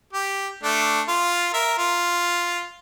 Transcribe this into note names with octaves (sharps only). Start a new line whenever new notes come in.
G4
A3 D4
F4
A#4 E5
F4